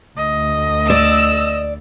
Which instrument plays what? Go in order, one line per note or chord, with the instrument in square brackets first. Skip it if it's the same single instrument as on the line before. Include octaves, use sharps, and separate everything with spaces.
[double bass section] D2 [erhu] D#5
[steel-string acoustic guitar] D5 [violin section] E6